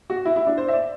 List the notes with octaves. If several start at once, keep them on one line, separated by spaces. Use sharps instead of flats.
F#4
E4
E4
D4
C5
E5
D5